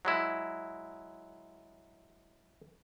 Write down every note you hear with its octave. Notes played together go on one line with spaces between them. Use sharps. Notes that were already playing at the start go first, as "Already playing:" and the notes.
F#3 G#3 E4